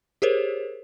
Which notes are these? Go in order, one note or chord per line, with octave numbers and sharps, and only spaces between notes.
G4 G#4 A#4 C5 C#5